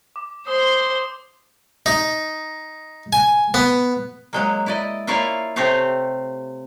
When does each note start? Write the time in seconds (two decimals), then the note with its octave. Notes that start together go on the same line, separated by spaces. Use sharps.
0.16 D6
0.47 C5 C6 D#6
1.86 D#4
3.13 G#5
3.54 B3
4.33 F#3 G#3 A#3
4.66 E4 D5 D#5
5.07 A#3 E4 F4 C#5 D5 F5
5.56 C3 A3 C4 G4 C#5 F5